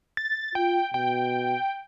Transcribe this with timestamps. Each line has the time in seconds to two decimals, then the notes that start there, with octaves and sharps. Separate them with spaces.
0.17 A6
0.55 F4 G5
0.94 B2 G5